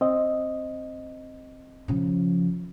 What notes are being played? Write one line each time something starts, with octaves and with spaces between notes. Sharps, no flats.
C4 D#5
C#3 F3